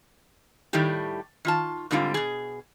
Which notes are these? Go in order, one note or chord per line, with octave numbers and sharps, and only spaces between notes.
A2 D#3 G3 A3 G4
D#3 F4 A5
G#2 D3 G3 C4 F4
B2 G#4